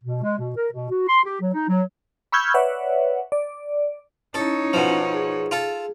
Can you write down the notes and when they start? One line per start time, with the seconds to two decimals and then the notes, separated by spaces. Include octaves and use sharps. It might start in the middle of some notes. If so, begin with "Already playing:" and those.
0.04 B2
0.23 G#3
0.39 B2
0.56 A#4
0.73 B2
0.90 F#4
1.08 C6
1.25 G4
1.41 F#3
1.54 D#4
1.68 F#3
2.32 B5 C#6 E6 F6 G6 G#6
2.54 B4 C#5 D5 E5 F#5
3.32 D5
4.34 C#4 D#4 E4 A4 C#5
4.73 B2 F3
5.13 G#4
5.51 F4 A4